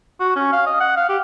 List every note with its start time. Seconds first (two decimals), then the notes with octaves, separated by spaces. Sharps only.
0.20 F#4
0.36 C#4
0.53 F5
0.66 D#5
0.80 F#5
0.96 F5
1.09 G4